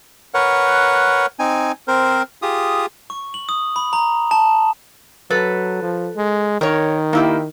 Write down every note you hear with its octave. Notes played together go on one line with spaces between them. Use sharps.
A#4 B4 C#5 F#5
C4 D#4 G#5
C4 A#4 C5
F4 G4 G#4 D#6
C#6
F#7
D#6
B5
A#5
A5
F#3 A4 B4
F3
G#3
D#3 A#4 C#5
A#3 E4 G4